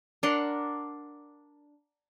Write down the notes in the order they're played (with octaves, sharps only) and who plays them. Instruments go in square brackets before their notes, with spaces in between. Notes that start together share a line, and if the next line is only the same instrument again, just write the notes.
[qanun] D4 A#4 F#5 C6